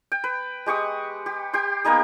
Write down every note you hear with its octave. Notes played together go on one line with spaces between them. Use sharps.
G5
B4
G#3 G4 C#6 D#6
G4
G4 G5 C6
A#3 B3 D#4 G4